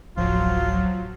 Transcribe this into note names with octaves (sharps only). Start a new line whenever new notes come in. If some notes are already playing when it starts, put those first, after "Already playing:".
D1 A1 F3 F#3 F4